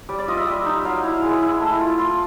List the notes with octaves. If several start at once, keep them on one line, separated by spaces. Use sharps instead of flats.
G3 D5
D5
F4 D#5
E5
G3
D#4
F#3 F5
E4
G#3
E4
A3
F4
F4